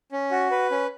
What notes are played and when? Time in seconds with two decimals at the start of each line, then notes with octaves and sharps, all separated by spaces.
0.12 C#4
0.31 F#4
0.51 B4
0.71 C#4